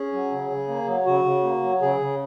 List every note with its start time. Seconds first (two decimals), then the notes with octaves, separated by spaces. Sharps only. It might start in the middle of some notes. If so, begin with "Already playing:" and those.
Already playing: C#4 G#4
0.13 F#3
0.31 C#3
0.50 C#3
0.68 A#3
0.87 F#3
1.06 C#3 F#4
1.24 C#3
1.43 A#3
1.63 F#3
1.81 C#3 G#4
2.00 C#3